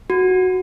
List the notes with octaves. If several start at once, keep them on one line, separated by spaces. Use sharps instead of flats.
F#4